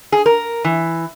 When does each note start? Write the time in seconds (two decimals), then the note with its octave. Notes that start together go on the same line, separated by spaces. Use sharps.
0.12 G#4
0.26 A#4
0.64 E3